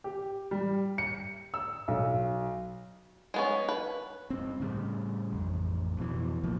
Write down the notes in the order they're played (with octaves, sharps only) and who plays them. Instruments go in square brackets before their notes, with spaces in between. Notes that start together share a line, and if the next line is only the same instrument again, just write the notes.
[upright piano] G4
G3
C#7
E6
B1
[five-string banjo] G#3 B3 C#4
B4
[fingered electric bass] G2 C4
A2 C#3 G3
A1 F2
F2 B2 E3
B1 A2 F3 A#3